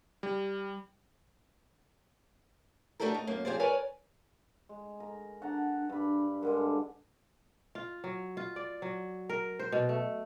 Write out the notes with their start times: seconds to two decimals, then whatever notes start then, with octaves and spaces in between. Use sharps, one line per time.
0.23 G3
3.00 A3 D4 F#4 G4 A4 A#4
3.15 D#4
3.27 F#2 A#3
3.45 F3 G4 G#4 C5 D5
3.60 A#4 B4 C#5 D5 G#5
4.69 G#3
5.00 A#4
5.42 D4 F#5 A5 A#5
5.90 G2 D4 B5
6.43 G2 D3 G#3 A#4
7.75 F4
8.04 F#3
8.37 F4
8.56 D5
8.82 F#3
9.29 A#4
9.59 C5
9.72 B2
9.89 A3